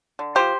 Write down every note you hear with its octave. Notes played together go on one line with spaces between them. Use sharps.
D3
F3 A3 G4 C5